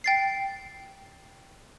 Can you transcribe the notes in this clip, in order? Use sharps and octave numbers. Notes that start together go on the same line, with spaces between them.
G5 A6 C7